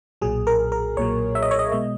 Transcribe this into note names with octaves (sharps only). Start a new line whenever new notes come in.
B1 A#2 F#3 G#4
A#4
A#4
B1 A#2 F#3 C#5
E5
D#5
C#5
D#5
B2 G#3 D#5